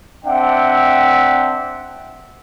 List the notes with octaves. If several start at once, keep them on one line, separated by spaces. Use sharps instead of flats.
C4 D4 E5 F#5 G5